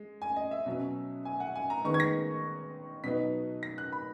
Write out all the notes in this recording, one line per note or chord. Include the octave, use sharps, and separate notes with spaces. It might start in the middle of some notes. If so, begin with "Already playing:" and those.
Already playing: G#3
G#5
D#5
E5
B2 F#3 C#4
G#5
F#5
G#5
A#5
D#3 G#3 B3 C#6
G#6
A#6
B2 F#3 B3 D#4 B6
A#6
F#6
B5